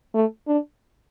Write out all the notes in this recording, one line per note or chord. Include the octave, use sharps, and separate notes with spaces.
A3
D4